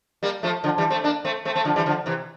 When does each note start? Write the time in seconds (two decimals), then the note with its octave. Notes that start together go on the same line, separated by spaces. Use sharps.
0.23 G3 A#3
0.43 F3 A3
0.64 D3 F3
0.78 E3 G3
0.90 A3 C4
1.04 A#3 D4
1.25 A3 C4
1.45 A3 C4
1.55 A3 C4
1.65 D3 F3
1.76 E3 G3
1.86 D3 F3
2.06 C3 E3